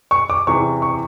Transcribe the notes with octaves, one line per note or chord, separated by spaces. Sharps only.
C#6
D6
E2 C3 E3 C#6
C#6